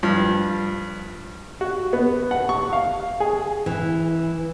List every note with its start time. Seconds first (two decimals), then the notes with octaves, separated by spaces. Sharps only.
0.03 G2 F3
1.61 F#4
1.93 B3
2.31 F#5
2.49 C#6
2.73 F5
3.20 G#4
3.66 E3